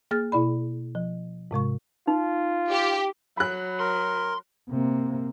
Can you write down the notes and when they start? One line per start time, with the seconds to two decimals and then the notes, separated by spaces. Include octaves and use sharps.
0.11 A#3 G#4 F6 A6
0.32 B2 E4 D5 B5
0.95 F3
1.51 G#2 C3 G#3 C#6
2.07 D#4 F4
2.70 G4
3.37 F#3 B5 F#6
3.79 A#4 C6
4.69 C3 A#3